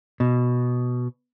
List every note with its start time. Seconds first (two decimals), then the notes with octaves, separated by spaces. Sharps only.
0.20 B2